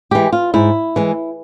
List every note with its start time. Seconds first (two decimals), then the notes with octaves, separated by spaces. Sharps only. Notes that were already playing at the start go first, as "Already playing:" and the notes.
0.11 E3 G#3 G4
0.32 F4
0.54 G#2 E4
0.96 E3 G#3